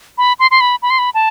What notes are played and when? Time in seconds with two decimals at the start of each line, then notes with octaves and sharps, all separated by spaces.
0.18 B5
0.39 C6
0.51 C6
0.61 B5
0.82 B5
0.90 C6
0.99 B5
1.15 A5